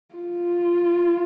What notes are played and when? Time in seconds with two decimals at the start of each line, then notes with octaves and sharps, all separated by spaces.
0.15 F4